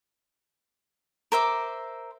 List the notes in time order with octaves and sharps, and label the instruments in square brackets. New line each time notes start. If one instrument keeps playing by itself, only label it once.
[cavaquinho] A#4 C5 E5 D6